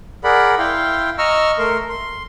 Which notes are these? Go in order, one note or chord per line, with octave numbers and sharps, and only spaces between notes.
G#4 A#4 D5 F#5 B5
E4 F5 G5 C6
D#5 A#5 C#6 E6 F6
A3 A#4 C6
C6